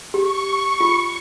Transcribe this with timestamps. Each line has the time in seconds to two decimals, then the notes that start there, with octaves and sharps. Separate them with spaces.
0.14 G4 C#6
0.80 F4